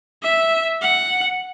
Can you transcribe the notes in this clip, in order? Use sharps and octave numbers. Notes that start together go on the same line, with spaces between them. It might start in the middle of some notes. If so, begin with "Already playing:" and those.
E5
F#5